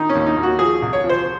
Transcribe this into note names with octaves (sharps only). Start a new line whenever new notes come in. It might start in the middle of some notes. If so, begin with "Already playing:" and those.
Already playing: D#3 D#4
C#4
D#2
D#4
D#2
F#4
F3 G#4
C2
C#5
F3
C5